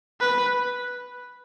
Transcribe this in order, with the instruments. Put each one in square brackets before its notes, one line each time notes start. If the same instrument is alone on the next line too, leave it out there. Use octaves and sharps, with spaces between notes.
[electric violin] B4